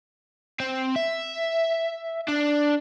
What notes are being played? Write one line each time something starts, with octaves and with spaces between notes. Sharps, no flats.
C4
E5
D4